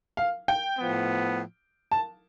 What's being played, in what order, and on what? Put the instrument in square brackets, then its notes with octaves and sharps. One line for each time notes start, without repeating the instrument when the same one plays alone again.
[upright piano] F5
G5
[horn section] A2 F3 B3
[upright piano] A5